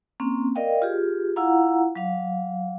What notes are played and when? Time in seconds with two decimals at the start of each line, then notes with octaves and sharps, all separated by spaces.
0.20 A#3 C4 C#4
0.55 A#4 D5 D#5 F5 G5
0.82 F4 G4 G#4
1.36 E4 F4 F5 F#5 A#5
1.95 F#3 F5